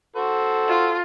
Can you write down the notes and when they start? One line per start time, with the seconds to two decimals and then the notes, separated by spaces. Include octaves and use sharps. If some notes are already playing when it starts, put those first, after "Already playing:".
0.16 F#4 A4 C5
0.68 F4